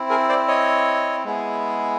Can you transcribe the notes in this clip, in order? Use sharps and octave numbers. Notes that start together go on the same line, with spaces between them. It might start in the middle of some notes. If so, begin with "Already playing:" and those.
Already playing: C4 E4
G#4 A#4
C5 D5
C#5 D#5
G#3 B3 E4 G#4